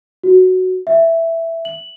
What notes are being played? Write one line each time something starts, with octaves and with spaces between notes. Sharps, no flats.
F#4
E5
F#7